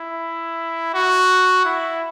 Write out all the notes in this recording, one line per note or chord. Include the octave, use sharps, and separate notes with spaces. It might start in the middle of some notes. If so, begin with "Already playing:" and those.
Already playing: E4
F#4
E4